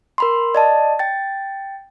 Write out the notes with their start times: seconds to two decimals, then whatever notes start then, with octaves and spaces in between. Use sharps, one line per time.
0.18 A#4 B5 C6
0.55 D5 D#5 A5
0.99 G5 A6